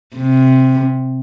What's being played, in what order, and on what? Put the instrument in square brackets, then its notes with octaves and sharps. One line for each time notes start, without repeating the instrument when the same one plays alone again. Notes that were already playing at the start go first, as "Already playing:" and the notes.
[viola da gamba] C3